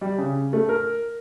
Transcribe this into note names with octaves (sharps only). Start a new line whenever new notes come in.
G3
C#3
A3
A#4